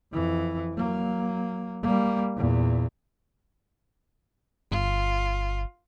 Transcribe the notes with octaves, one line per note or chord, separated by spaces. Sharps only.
F2 E3
F#3 A#3
G3 A#3
E2 A#2
G1 F4